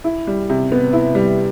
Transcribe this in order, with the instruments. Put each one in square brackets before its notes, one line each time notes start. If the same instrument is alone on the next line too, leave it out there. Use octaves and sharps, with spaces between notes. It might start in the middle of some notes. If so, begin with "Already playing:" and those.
[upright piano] E4
G3
C3
B3
E4
G3